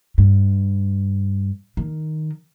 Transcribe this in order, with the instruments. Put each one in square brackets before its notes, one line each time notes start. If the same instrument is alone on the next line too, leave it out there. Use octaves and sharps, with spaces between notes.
[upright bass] G2
D#3